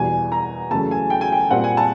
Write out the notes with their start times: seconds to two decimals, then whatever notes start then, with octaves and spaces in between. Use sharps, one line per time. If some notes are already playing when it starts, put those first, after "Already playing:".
Already playing: E2 B2 G3 G#5
0.32 A#5
0.71 E2 C#3 F#3 A3 A5
0.91 G#5
1.10 G5
1.21 G#5
1.32 G5
1.51 A#2 G3 C4 F#5
1.64 G#5
1.77 A5